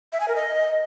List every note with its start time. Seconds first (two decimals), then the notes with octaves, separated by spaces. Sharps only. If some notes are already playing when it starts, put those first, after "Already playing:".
0.13 E5
0.20 G#5
0.28 A#4
0.36 D#5